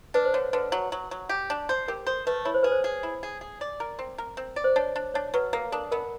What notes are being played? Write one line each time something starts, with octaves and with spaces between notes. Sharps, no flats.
D4 B4
C5
D3 C#5
D3 B4
F#3
F#3
F#3
G4
D4
C5
G4 A#4
A4 C5
A3 B4
E4 C#5
C5
G#4 B4
C5
G#4
E4
G#4
G#4
D5
A#4
C4
A#4
C4
D5
C5
D4 C#5
D4
D4 C#5
F#3 B4
A#3 A#4
D4 A4
B3 A#4